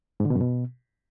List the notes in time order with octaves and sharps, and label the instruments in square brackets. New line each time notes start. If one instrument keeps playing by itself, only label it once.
[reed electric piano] G#2
D3
B2
F#2
B2